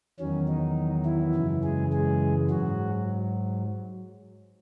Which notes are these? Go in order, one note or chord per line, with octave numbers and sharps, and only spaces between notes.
E2 D#3 F#3 C#4
D#4
E3 E4
F#2 C#3 E3
G#3 G#4
G#3 G#4
G#2 F#3 F#4